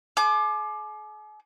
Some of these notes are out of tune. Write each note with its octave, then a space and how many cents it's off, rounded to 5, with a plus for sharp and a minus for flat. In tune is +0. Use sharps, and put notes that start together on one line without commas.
G#4 +45 D6 +20